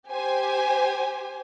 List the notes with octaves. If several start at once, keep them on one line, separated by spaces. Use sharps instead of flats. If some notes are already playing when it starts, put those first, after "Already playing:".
G4 C5 G#5